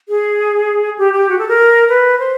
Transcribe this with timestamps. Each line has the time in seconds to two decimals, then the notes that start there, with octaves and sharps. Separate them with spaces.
0.09 G#4
0.99 G4
1.13 G4
1.29 F#4
1.39 A4
1.48 A#4
1.89 B4
2.19 C5